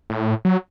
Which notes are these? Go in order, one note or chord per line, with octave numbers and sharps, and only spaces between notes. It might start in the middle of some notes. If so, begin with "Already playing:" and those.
A2
F#3